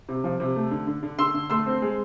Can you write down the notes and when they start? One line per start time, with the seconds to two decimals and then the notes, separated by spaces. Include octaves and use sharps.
0.09 C3
0.24 F3
0.40 C3
0.56 A3
0.71 D3
0.87 D3
1.03 D3
1.19 D3 C6 E6
1.34 D3
1.50 A3 C6 E6
1.66 C4
1.82 G#3